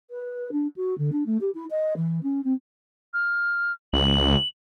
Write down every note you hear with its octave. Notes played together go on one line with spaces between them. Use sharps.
B4
D4
F#4
D3
D4
A3
G4
E4
D#5
E3
C#4
C4
F6
C#2 F#7